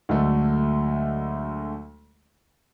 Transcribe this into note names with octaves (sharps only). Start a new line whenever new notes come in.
D2 D3 F#3 G#3 A3